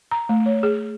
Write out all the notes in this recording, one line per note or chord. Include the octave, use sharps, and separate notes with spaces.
A#5
A3
C#5
G#4